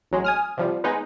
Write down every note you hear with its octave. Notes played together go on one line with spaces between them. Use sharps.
A1 F#3 G#3
G#5 D#6 F6
C3 F3 G3
G#3 B3 D#4 B4